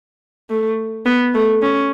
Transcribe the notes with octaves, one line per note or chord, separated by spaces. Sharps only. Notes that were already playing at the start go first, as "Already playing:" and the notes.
A3
B3
A3
C#4